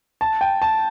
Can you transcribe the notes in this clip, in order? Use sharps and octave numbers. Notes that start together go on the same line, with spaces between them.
A5
G5
A5